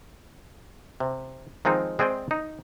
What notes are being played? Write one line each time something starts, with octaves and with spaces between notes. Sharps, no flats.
C3
D#3 F3 G#3 C4 D#4
G#3 C4 G#4 D5 G5
D#4